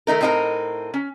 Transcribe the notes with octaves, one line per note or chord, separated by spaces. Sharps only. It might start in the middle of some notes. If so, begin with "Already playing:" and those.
D#3 A3 D#4 A#4
A2 C4 D#4 F4 A#4 A#5
C#4